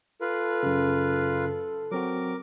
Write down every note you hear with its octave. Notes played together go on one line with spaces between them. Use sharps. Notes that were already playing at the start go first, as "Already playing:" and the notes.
F4 A4 B4
F#2 C#3
F#3 C4 F#4 A#4 D6